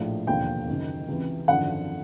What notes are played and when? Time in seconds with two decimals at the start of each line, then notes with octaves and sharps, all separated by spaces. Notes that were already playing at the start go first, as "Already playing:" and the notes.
Already playing: A#1 A2 F3
0.27 E1 D#2 D3 F3 G5
0.68 F#1 F#2 D#3
1.08 C#2 C3 E3
1.48 G#1 F#2 D3 F3 F#5